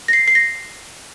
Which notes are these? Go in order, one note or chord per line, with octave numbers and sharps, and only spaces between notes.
A#6
C7
C7
A#6